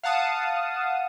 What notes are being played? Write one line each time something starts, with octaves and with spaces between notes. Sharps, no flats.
F5 F#5 A5 D#6